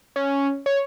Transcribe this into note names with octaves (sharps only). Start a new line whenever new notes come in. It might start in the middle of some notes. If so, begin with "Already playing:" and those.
C#4
C#5